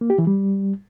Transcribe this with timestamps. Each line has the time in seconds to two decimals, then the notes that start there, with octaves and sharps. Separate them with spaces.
0.01 A#3
0.10 G4
0.18 E3
0.27 G3